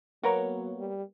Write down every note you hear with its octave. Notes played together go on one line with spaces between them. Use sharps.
F#3 A#3 B3 F#4 A#4 C#5
G3